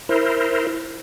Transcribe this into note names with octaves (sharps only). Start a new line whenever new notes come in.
E4 A#4 C5